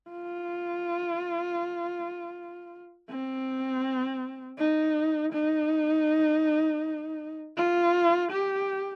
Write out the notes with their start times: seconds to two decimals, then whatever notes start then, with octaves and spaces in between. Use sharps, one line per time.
0.10 F4
3.10 C4
4.58 D#4
5.33 D#4
7.58 F4
8.32 G4